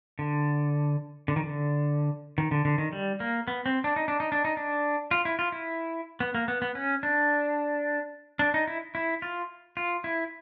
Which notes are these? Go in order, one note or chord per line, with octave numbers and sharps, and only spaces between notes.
D3
D3
D#3
D3
D#3
D3
D3
D#3
G3
A#3
B3
C4
D4
D#4
D4
D#4
D4
D#4
D4
F4
E4
F4
E4
B3
A#3
B3
B3
C#4
D4
D4
D#4
E4
E4
F4
F4
E4